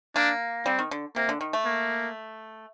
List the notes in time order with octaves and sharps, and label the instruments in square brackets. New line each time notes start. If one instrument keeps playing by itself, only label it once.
[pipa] A#3 [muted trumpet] D4
[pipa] G3 [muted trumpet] C4
[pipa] D#3
D3
[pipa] C3 [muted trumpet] A#3
[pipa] D3
D#3
A3
[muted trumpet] A#3